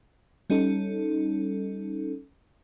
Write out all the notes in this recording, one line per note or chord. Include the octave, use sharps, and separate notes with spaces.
G3 C#4 D#4 A4